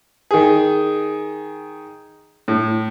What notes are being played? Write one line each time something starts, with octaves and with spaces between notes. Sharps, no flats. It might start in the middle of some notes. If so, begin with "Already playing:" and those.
D#3 G#4
A2